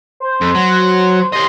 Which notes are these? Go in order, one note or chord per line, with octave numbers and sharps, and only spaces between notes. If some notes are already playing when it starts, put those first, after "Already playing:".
C5
F2
F#3
G4 D#5 C6